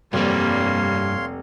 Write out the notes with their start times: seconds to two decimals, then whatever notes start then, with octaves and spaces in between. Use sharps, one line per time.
0.13 F1 G2 G3 A#3 C4 C#5 F5 C6